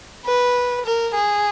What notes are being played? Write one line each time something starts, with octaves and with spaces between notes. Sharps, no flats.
B4
A#4
G#4